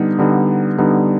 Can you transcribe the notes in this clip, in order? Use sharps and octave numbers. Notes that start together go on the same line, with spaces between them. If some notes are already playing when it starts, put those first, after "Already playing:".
Already playing: D3 G3 B3 D#4
D3 G3 B3 D#4
D3 G3 B3 D#4